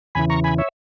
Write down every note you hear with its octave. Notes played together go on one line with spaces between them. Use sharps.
E2 C#3 E3 G#5 B5
A#5 C#6
G#5 B5
C#5 E5